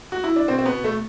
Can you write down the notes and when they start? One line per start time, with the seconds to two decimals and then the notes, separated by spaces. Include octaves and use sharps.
0.12 F#4
0.24 E4
0.36 D4
0.48 B2 C4
0.59 C4
0.66 B3
0.72 B2
0.84 A3